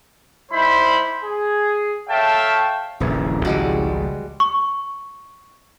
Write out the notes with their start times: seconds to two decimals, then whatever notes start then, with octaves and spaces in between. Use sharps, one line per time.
0.52 G3 D#4 E4 C5 B5
1.24 G#4
2.09 A4 C#5 E5 F5 G5 A5
3.00 D#1 A#1 F2 A#2 C#3 E3
3.45 G#1 C#2 F3 G3 G#3 F#4
4.40 C#6